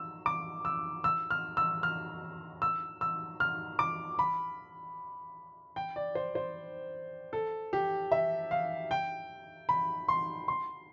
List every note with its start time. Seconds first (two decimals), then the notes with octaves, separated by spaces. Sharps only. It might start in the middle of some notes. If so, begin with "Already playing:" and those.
Already playing: E6
0.26 D6
0.65 E6
1.04 E6
1.30 F6
1.57 E6
1.83 F6
2.62 E6
3.01 E6
3.40 F6
3.79 D6
4.19 B5
5.76 G5
5.96 D5
6.15 C5
6.35 C5
7.33 A4
7.73 G4
8.12 E5
8.51 F5
8.91 G5
9.69 B5
10.08 C6
10.48 C6